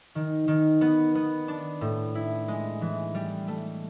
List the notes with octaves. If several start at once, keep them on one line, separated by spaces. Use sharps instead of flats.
D#3
D#3
B3
B3
D4
A2
E4
G#3
E3
G3
A3